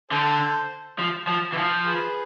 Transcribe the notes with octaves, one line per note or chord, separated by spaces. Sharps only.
D3 A4 C5
F3
F3
E3
F3
G#4 B4